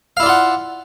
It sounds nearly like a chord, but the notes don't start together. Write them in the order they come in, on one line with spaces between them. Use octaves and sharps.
F5 E4 D5 F4 F#5